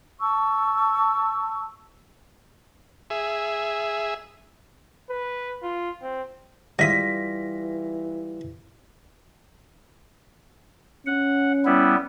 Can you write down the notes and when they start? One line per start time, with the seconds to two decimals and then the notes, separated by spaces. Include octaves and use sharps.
0.20 A5 C#6 E6
3.10 G#4 E5
5.10 B4
5.62 F4
6.02 C4
6.79 G#2 E3 G3 E4 F4 D#6 A#6 B6
11.06 C#4 F#5
11.65 G3 B3 E4